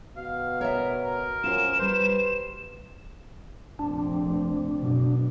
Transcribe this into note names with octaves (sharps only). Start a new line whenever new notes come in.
B2 F5
A#4 C#5 D5 E5
A#4
F#2 F4 C5 E7
G3 F#4 B4 C5
F1 A#1 C4 D4
F#1 B2